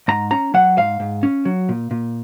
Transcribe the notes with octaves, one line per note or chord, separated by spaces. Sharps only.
G#2 A#5
C#4 A#5
F#3 F#5
G#2 F5
G#2
C#4
F#3
A#2
A#2